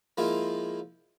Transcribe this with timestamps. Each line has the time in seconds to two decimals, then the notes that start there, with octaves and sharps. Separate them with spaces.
0.17 F3 G#3 A#3 E4 F4